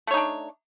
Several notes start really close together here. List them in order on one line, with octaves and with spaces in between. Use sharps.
A3 C#5 D#4 D4